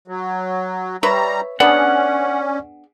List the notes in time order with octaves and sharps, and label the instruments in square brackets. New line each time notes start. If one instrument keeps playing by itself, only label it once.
[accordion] F#3
[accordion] G3 A#5 [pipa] B4 C#5 E5
[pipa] B3 D4 G#4 [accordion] C#4 [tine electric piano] D5 [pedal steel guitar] F#5